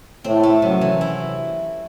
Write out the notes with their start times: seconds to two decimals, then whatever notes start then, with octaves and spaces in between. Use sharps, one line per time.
0.24 A2 C4
0.43 A3
0.62 F#2 C3 F#3
0.81 E3
1.01 E4